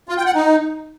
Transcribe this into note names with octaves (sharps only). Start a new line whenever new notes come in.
F4
G5
F#5
D#4